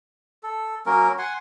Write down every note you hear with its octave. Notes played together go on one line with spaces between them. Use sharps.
A4
F#3 A#3 C#4 A#4
F#5 G#5 C6